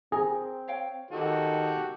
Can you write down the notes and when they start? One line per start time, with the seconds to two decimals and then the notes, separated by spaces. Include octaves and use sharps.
0.12 C4 G#4 A#4
0.68 C#5 F5 G5
1.11 D#3 F#4 G4 A4